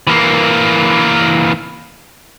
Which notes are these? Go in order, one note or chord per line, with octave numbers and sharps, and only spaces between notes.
E3 A#3